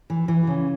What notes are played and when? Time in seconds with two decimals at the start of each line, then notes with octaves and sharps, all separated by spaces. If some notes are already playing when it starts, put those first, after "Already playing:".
0.10 E3
0.28 E3
0.47 C#3